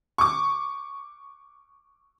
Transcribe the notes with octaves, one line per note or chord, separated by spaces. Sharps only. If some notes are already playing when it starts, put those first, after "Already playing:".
C#6 D6